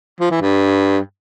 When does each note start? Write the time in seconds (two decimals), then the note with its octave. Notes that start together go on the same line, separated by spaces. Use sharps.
0.20 F3
0.31 E3
0.41 G2